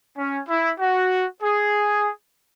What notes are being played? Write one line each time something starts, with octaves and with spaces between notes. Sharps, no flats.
C#4
E4
F#4
G#4